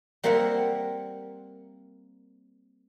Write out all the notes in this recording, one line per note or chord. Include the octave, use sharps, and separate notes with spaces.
G3 A#3 C4 A#4 E5 F#5